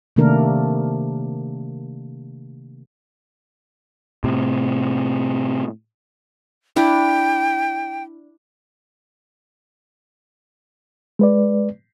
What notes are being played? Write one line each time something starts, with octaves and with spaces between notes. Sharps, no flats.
C3 D#3 A3 A#3 D4 A#4
A2 C3
D4 E4 G5
G#3 B4 D5